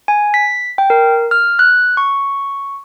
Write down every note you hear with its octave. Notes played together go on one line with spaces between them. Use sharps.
G#5
B6
G5
A#4
F6
F#6
C#6